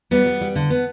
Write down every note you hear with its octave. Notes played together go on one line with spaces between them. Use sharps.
G3 B3
G3
G3
D3
B3